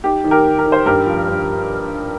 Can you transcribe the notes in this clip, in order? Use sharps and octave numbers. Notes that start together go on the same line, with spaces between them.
D#4 G4
D#3
G4 A#4
D#3
A#4
D#3
C5
G2 G4 A#4
F3
G2